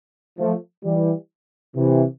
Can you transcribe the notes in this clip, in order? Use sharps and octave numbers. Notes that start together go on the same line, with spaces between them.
F3 A3
E3 G3
C3 E3